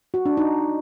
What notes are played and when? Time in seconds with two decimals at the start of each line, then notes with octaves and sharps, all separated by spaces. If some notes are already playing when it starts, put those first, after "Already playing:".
0.14 F#4
0.26 D4
0.37 D#4